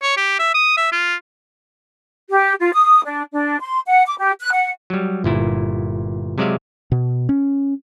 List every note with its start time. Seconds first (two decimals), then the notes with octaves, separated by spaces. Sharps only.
0.02 C#5
0.17 G4
0.39 E5
0.54 D#6
0.77 E5
0.92 F4
2.30 G4
2.60 F4
2.73 D#6
3.04 D4
3.32 D4
3.60 C6
3.86 F#5
4.06 D6
4.18 G4
4.40 F#6
4.52 F#5
4.90 F#3 G3
5.24 G1 A#2 E4
6.38 C3 F#3 G#3 D5 E5 F5
6.92 B2
7.29 C#4